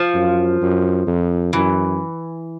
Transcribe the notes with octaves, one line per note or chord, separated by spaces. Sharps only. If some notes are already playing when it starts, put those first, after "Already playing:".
Already playing: F3
F#2
F#2
F2
F#2 E3